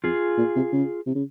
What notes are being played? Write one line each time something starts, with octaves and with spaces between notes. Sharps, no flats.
F2 F4 G#4
A#2
C3
C#3
C3
C#3